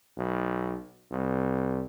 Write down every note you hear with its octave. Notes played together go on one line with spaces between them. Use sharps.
B1
C2